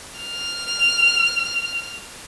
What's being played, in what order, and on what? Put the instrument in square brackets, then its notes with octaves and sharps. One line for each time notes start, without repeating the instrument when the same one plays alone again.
[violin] F6 F7